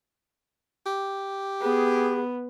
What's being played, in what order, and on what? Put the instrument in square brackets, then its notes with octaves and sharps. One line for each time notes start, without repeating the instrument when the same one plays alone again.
[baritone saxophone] G4
[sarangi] B3 [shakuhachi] G#4